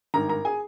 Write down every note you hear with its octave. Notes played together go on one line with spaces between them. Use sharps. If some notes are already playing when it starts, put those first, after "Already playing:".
G#1 G2 D#3 A#4 A#5
A#4 A#5
G#4 G#5